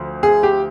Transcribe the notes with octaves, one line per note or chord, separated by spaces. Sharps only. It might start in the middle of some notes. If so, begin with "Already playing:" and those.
Already playing: D2 F3
G#4
G4